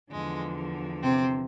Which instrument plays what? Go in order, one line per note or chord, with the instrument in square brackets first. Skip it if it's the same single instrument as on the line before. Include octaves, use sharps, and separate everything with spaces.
[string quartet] E2 D3 F3 G#3
C3 C4